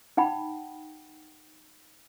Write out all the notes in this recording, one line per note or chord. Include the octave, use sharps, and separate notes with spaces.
D#4 F#5 G5 B5